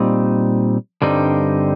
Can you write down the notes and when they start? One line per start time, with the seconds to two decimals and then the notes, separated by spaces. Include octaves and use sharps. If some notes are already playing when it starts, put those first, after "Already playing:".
Already playing: A#2 G3 C4 D#4
1.02 G2 D3 G3 C4 D#4